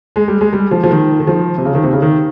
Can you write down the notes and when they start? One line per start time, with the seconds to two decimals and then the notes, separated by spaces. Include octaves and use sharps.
0.16 G#3
0.28 G3
0.41 G#3
0.53 G3
0.71 F3
0.84 F3
0.91 D#3
1.20 D#3
1.27 F3
1.58 C3
1.65 C#3
1.75 D#3
1.84 C3
1.93 C#3
2.02 D#3